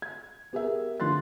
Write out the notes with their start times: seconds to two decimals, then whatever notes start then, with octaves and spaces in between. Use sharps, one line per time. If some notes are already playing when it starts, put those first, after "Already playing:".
0.02 G#6
0.53 B3 G4 G#4 A#4 E5
1.00 D3 F3 C6 F#6 A6